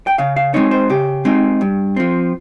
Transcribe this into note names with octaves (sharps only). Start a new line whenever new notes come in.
G5
C#3 F5
F5
G#3 C4 D#4 C#5
C5
C#3 G4
G#3 C4 D#4
G2
F3 C4